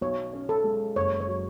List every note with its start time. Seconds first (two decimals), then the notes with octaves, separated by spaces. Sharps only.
0.01 B1 C#5
0.33 C#4
0.49 A4
0.64 G#3
0.96 F#1 C#5
1.21 C#5
1.28 F#3